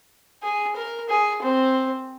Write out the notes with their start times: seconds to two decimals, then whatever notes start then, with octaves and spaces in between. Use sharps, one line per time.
0.43 G#4
0.76 A#4
1.09 G#4
1.42 C4